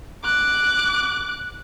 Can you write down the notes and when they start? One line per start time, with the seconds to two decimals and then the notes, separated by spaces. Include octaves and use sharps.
0.24 D6 F#6